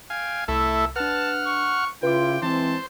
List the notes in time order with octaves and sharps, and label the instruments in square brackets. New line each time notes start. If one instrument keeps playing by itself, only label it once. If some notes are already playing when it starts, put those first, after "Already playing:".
[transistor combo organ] F5 G#5 [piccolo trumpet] G5
[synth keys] C2 [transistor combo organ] A3 E4 A4 [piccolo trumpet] E6
[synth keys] D4 B4 [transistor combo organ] F#5 F6 [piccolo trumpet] A5
[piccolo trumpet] C#6
[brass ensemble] C#3 E4 F4 [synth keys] B4 C6 D6 [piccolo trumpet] G5
[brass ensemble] E3 G#3 C4 [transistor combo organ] C5 [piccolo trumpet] A5